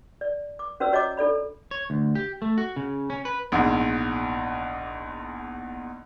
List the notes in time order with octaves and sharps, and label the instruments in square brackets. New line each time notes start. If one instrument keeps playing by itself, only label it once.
[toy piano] D5
D6
C#4 F#4 B4 C5 D5 E6
F#4 C#5 D#5 A#5 D6
D4 A4 D5 B5
[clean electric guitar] C#5
D2
G4
A3
F#4
C#3
C#4
B4
[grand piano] A#1 E2 G#2